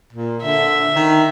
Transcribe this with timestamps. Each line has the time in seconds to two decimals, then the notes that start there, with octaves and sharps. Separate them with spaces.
0.13 A#2
0.43 D3 E5
0.96 D#3